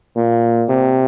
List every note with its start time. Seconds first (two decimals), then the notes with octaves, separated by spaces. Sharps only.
0.16 A#2
0.69 C3